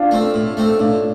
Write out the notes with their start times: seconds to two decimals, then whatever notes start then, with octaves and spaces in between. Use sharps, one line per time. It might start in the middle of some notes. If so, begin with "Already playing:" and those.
Already playing: D4 F4
0.11 A3 C4
0.34 A2
0.57 A3 C4
0.79 A2 D4 F4